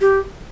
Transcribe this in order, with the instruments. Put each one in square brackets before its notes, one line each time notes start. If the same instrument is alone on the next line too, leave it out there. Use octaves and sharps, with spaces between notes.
[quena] G4